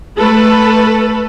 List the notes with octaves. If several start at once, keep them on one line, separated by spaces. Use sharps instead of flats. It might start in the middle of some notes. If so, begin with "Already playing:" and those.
A3 A4 B4